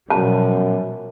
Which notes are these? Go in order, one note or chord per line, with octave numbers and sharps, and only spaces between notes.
F#2 B2 F3 G3 A5